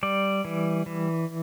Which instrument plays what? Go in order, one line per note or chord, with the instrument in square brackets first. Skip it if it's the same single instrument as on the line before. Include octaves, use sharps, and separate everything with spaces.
[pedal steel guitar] G3 D5
E3
E3